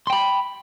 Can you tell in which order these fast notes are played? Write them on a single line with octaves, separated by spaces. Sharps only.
C6 G5 B5